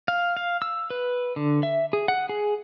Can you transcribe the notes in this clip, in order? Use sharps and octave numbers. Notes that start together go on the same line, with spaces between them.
F5
F5
E6
B4
D3
E5
G#4
F#5
G#4